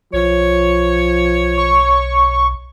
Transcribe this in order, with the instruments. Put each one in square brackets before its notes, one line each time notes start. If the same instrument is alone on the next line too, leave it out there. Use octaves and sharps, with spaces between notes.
[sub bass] B1 [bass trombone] F3 [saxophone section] C#5
[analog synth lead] C#6